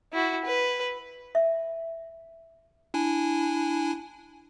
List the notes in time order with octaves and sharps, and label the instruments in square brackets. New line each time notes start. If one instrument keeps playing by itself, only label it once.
[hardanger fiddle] E4 F#4
B4
[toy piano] E5
[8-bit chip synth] D4 E4 G#5